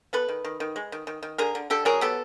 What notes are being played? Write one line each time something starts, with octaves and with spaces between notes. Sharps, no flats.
B3 A4 B4
D#3
D#3
D#3
G#3
D#3
D#3
D#3
D3 G#4 A#4
D3
D3 G4 A4
F#3 G#4 A#4
B3 G4 A4